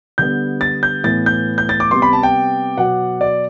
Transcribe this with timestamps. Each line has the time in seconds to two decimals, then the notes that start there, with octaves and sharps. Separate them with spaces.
0.18 D3 G3 B3 G6
0.61 A6
0.83 G6
1.04 A2 E3 B3 A6
1.26 G6
1.58 G6
1.69 A6
1.80 D6
1.91 C3 G3 B3 C6
2.02 B5
2.13 A5
2.23 G5
2.77 B2 F#3 B3 F#5
3.21 D5